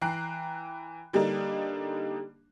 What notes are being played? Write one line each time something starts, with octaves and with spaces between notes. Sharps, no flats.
E3 G5 A#5 F#6 C7
D3 G3 A#3 D4 D#4